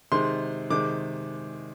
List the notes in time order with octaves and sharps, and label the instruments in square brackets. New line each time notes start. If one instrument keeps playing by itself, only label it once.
[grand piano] C3 D#3 G#3 C6
C3 D#3 G#3 D6